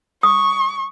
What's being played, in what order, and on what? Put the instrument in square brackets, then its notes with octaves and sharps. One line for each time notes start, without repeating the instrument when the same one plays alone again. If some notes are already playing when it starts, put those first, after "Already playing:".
[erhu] C#6 [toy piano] D#6